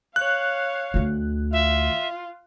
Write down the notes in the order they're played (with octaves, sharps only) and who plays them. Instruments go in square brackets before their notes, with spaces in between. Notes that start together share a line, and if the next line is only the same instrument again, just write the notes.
[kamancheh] C#5 F5 [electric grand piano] F#6
[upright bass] D2 D3
[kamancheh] F4 [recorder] E5